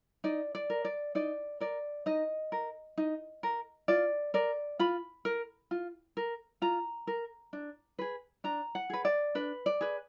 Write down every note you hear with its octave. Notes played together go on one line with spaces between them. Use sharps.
D#4 D5
D5
A#4
D5
D#4 D5
A#4 D5
D#4 D#5
A#4
D#4
A#4
F4 D5
A#4 D5
F4 B5
A#4
F4
A#4
F4 A#5
A#4
D4
G#4 B4
D4 A#5
F#5
G#4 B4
D5
D4 B4
D5
G#4 B4